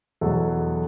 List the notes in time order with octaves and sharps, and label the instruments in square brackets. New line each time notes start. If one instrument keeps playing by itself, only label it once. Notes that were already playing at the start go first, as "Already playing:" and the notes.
[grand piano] E2 B2 F#3 F#4 A4